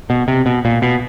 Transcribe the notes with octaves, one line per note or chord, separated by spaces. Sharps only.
B2
C3
B2
A#2
B2